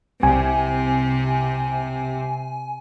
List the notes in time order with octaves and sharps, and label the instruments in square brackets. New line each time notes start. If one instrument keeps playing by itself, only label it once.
[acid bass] C2 [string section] C3 [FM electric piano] G#5